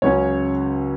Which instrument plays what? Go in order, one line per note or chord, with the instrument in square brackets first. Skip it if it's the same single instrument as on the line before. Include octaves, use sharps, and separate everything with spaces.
[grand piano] C#2 C#3 F#3 C#4 C#5